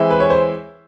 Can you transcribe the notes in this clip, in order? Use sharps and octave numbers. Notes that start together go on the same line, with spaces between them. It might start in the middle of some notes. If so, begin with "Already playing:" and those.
Already playing: E3 G#3 C4 E4
B4
C#5
C5